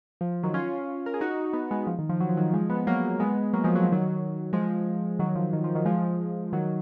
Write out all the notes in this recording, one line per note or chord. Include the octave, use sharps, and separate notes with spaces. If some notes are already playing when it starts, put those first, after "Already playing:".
F3
F3
D#3 F#3
C#4 F4
A#4
G#4
D#4 F#4
B3 D#4
G#3 B3
F3
D#3
F3
F#3
F3
D#3 F#3
F3 G#3
G#3 B3
F#3 A#3
G#3 B3
F#3 A#3
F3 G#3
F#3
F3
D#3 F#3
F3 G#3
D#3 F#3
F3
D#3
F3
D#3 F#3
F3 G#3
D#3 F#3